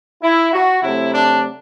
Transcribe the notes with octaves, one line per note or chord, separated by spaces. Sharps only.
E4
F#4
C3 F#3 A3 E4
D4